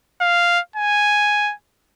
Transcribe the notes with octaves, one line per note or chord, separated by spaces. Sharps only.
F5
G#5